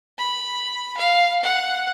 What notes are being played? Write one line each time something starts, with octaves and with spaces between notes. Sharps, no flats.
B5
F5
F#5